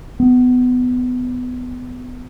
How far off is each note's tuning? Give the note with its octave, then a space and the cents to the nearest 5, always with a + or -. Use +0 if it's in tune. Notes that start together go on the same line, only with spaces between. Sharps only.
B3 +20